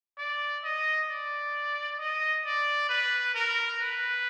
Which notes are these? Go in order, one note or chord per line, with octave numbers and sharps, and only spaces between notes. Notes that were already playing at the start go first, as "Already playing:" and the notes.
D5
D#5
D5
D#5
D5
B4
A#4
B4